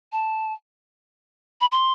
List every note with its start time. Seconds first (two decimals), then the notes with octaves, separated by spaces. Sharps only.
0.12 A5
1.61 B5
1.72 C6